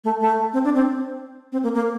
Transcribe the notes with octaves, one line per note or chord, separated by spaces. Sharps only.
A3
A3
C4
D4
C4
C4
A#3
A#3